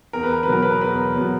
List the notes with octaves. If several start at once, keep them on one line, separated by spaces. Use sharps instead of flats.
E2 A#4
B4
A#4
B4
B2 F#3 A#4
B4
A#4
E2 B4
A#4
B2 F#3